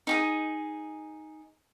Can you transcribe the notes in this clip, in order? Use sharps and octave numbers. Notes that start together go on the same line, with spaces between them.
D#4 G4 G#4